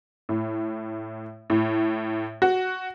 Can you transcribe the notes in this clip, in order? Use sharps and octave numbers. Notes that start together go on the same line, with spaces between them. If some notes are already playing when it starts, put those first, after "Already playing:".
A2
A2
F#4